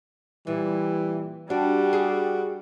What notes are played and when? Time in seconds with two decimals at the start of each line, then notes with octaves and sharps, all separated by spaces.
0.47 A#2 E3 G3
1.50 G3 D4 F#4 G4
1.93 G#4